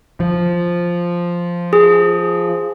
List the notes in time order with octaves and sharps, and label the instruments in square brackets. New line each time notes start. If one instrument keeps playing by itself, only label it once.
[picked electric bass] F3
[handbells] G#4